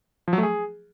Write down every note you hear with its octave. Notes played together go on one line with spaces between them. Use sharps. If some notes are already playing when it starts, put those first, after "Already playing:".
F3
F#3
A3
G#4